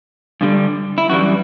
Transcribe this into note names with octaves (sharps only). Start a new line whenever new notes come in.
G2 D3 G3
E4
F#2 E3 G3 F#4